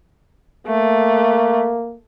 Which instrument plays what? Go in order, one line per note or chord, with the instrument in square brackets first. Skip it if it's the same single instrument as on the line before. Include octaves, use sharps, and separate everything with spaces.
[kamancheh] A3 [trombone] A#3